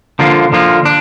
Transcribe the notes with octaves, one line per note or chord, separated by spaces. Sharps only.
D3 F3 A#3 F4
D3 F3 A#3 F4
D4